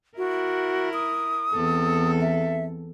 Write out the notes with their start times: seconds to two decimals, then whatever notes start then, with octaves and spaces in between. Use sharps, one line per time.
0.18 E4 F#4 A#4
0.94 D#6
1.54 E2 C4 A4
2.21 E5